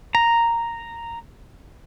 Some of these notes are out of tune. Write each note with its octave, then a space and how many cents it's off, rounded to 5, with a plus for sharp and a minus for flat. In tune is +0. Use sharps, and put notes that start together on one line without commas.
A#5 -5